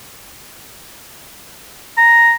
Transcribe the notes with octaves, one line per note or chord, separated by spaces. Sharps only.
A#5